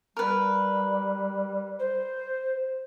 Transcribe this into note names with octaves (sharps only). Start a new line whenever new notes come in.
G3 A#4 B4
C5